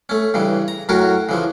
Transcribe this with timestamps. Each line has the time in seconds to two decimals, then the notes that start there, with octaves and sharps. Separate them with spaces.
0.09 A3 C#4
0.34 G2 C#3 E3
0.68 A#5
0.89 F#2 A2 C#4 F#4 A#4
1.29 C#3 E3 F3